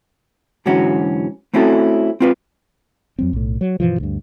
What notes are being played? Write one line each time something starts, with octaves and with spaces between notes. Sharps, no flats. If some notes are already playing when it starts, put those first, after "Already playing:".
G#2 D3 E3 F#3 C#4 F#4
A3 C4 C#4 E4 F#4 A4
C4 F4 B4
F2 F#3 C4
B1 A2
F#3
G2 B2 E3 F3
D2 G2